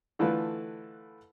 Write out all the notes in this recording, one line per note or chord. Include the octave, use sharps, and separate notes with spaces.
D3 E3 A3 E4 F4 B4